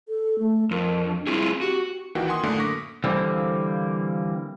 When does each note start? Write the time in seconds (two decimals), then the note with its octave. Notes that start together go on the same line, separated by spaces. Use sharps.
0.08 A4
0.39 A3
0.71 F2 A#4
1.05 D4
1.27 C4 E4 F4 G#4
1.61 F#4 G4
2.15 A#1 A#2 D#3 E3 F#4 G5
2.28 F#5 G#5 C6 D#6
2.43 F#2 A2 D3 A3 A#3
2.60 C#6 D6 A#6 B6
3.04 D3 E3 G3 A#3 C4